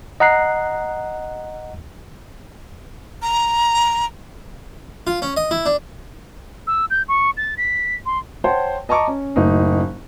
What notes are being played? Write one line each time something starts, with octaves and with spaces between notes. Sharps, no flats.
D#5 F#5 A#5 F#6 C7
A#5
F4
C#4
D#5
E4
D4
E6
G6
C#6
A6
B6
C6
C5 C#5 F#5 G5 A5
D#5 A5 A#5 C#6 D6
C#4
F#1 A2 D#4